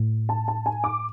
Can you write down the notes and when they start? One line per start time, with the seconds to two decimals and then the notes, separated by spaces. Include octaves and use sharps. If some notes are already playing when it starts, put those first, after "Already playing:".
Already playing: A2
0.29 A5
0.48 A5
0.66 G#5
0.84 D6